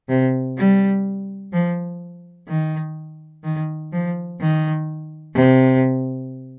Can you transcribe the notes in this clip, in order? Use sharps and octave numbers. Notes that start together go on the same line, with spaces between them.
C3
G3
F3
D#3
D#3
F3
D#3
C3